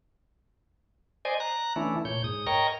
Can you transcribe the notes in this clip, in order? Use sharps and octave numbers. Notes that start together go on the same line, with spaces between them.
C5 D5 D#5 G#5
A#5 F#6
E3 A3 C#4 D4 E4
A#2 C#5 G6
G#2 D#6
A#4 C#5 D#5 G5 A#5 C#6